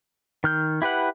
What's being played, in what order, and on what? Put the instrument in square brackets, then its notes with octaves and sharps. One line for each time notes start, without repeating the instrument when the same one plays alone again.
[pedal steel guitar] D#3 F6 G6
E4 G4 B4 F#5